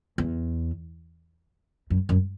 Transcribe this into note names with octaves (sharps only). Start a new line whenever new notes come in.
E2
F#2
F#2